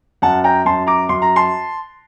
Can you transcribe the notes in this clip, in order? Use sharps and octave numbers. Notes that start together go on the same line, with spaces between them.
F#2 F#5 A5
G5 A#5
F#2 A5 C6
A#5 D6
F#2 C6
A#5
A5 C6